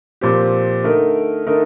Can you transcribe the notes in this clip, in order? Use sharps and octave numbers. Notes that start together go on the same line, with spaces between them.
A#2 F3 C4 G4
D3 A3 D#4 A#4
D3 A3 D#4 A#4